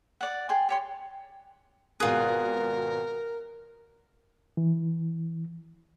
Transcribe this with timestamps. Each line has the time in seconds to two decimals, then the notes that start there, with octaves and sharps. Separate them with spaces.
0.21 D5 F#5
0.49 G#4 G5 C6
0.69 G4 C#5 C6
2.00 G#1 B2 F4 G#4 A#4 F#6
4.57 E3